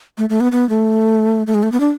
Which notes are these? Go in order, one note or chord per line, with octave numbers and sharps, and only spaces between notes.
A3
A3
B3
B3
A3
A3
G#3
A3
B3
D4